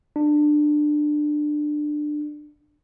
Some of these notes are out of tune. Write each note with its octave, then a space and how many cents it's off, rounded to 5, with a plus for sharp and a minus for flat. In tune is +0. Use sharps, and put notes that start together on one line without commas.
D4 +20